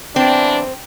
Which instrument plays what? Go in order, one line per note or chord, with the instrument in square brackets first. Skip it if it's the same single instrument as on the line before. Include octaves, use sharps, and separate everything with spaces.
[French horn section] E2 E3 D4 [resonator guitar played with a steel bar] C4